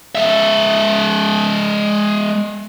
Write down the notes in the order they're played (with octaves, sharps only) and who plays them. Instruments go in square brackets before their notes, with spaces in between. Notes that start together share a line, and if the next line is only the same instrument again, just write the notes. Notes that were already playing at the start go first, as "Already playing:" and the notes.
[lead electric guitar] G#3 E5